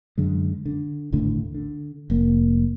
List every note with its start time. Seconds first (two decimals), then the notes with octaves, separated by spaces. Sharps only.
0.18 F#2 D3 G#3
0.66 D3
1.12 G#1 D2 A2 D3
1.55 D3
2.10 F1 A#3